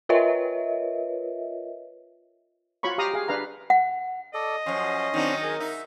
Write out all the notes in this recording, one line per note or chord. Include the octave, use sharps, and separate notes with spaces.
F4 A#4 B4 C#5 D#5 E5
F4 F#4 C#5 B5 C#6
G4 F5 A#5 D#6
G#4 F5
D4 B4 F5 A#5
F#5
A4 D5 D#5
F#2 F3 C#4 C6
D#3 F#3 C4 D4 D#4
G#4 A#4
D#4 E5